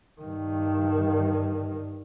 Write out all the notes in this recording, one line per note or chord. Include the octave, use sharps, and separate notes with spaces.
G2 D#3